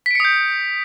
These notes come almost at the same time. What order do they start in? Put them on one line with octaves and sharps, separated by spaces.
B6 D7 C#7 D#6 G6